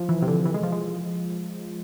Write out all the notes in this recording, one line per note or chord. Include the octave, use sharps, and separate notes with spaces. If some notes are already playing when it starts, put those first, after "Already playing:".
Already playing: F3
E3
C3
D3
E3
G#3
F3
G#3